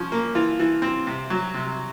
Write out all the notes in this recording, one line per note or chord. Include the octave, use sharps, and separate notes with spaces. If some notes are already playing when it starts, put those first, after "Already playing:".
Already playing: F3 C#4
A#3
E3 F4
E3
C4
C3
F#3
C3